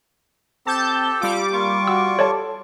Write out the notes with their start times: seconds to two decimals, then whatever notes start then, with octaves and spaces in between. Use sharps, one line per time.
0.67 C4 G4 A4 A5 G6
1.21 G3 F4 D6
1.53 A#3 F4 C#6
1.88 F#4 E6
2.19 A4 C#5 D5 A5